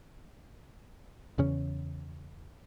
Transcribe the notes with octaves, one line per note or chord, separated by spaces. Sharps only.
E2 C#3 C#4